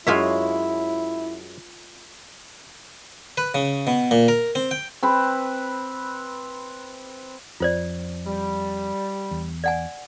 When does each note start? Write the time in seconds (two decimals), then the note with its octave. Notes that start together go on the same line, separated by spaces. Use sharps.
0.07 F#2 G#3 E4 F4 C#5 E5
3.38 B4
3.54 C#3
3.87 B2
4.11 A#2
4.28 A#4
4.55 C4
4.71 G5
5.03 C4 B4
7.60 F2 F4 C5 D5
8.26 G3
9.31 E2
9.64 D5 F#5 G#5